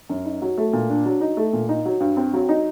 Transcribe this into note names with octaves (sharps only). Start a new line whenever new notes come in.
F#2
D#4
F#3
A3
A#2
D4
F#3
D#4
A3
A#2
D#4
F#3
G2
C4
F#3
D#4